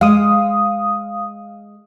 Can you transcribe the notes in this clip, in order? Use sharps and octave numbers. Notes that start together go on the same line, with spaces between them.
G#3 F5 D#6